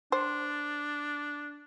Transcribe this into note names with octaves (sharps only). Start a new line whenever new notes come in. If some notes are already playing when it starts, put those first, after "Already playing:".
D4 C5